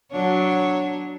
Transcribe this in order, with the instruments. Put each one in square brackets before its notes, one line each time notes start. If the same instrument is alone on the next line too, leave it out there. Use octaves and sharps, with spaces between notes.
[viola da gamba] F#3 D4 C#5